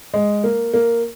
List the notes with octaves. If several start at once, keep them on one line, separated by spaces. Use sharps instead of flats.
G#3
A#3
A#3